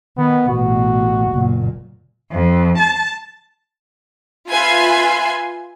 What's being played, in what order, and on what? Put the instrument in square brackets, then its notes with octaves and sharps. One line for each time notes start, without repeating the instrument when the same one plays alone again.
[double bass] D#3 [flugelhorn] B3
[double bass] A1 B2 [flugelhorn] F#4
[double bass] F#1 A#2
[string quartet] F2
A5
[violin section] F4 B4 E5 G#5 C6